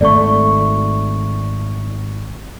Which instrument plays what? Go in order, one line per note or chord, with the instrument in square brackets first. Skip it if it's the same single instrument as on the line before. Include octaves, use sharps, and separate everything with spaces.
[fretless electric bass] G#1 A3 [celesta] D5 C#6